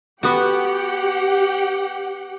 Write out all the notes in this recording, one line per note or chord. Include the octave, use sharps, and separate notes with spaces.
B3 F#4 G4 F#5 G5